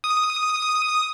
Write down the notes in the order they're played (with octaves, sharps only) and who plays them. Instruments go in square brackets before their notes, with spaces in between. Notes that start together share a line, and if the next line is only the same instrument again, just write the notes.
[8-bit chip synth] D#6